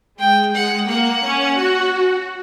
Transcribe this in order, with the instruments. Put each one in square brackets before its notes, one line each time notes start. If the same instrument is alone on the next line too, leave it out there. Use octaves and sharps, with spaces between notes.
[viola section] G#3 [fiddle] G5
[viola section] G#3 [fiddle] F#5
[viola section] A#3 [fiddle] F#5
[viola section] C#4
F#4